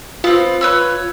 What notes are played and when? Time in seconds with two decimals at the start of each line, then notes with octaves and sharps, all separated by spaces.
0.24 B3 C4 F4
0.61 B4 C#5 E6